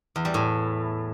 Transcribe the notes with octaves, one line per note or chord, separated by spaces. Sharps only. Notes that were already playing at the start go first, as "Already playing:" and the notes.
E2
G3
A2